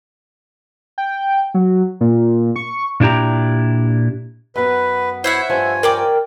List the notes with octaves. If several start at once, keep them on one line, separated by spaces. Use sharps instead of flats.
G5
F#3
A#2
C#6
A#2 D4 E4 G4 A#5
F#2 B3 B4
E4 C5 C#5 E5 F#5
G2 F3 C#5 G#5
A#4 D5 G5 D6